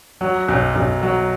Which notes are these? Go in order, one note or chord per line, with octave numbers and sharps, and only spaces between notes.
F#3
B1
B1
F#3